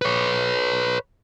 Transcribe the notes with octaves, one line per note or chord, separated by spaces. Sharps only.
B4 C#5